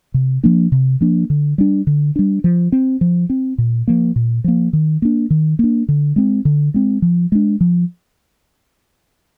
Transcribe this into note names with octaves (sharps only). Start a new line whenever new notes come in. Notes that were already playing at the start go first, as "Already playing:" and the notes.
C3
F3 A#3 D4
C3
F3 A#3 D4
D3
G3 D4
D3
G3 D4
F3
C4
F3
C4
A#2
F3 A#3
A#2
F3 A#3
D#3
A#3 D4
D#3
A#3 D4
D3
G#3 C4
D3
G#3 C4
F3
G#3 D4
F3